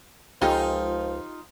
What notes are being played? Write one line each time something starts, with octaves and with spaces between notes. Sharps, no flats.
C#2 F3 D#4 F4 G4 A4 G#5